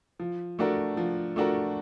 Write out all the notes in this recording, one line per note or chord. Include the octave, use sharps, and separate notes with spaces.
F3
A3 D4 F#4 A#4
F3
A3 D4 F#4 A#4